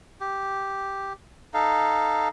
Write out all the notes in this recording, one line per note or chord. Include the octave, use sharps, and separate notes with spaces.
G4
D#4 A4 F5